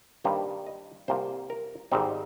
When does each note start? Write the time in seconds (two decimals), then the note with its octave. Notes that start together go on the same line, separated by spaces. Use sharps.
0.24 G2 D#3 G3 A#3 C5
0.67 D#5
1.08 C2 C3 F3 A#3 C5
1.50 A#4
1.92 G#1 G#2 G3 C4 D#4